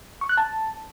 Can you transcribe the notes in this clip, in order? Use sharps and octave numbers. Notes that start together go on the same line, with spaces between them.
C#6
F#6
A5